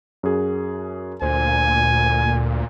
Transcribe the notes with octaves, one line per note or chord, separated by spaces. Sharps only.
F#2 F#4 G#4
D2 A#2 C5 G#5